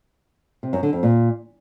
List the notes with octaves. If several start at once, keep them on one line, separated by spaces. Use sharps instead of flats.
C3
F#2
D3
F2
A#2